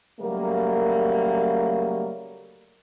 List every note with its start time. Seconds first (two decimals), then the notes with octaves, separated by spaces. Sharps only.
0.19 C#3 F#3 G3 A3 A#3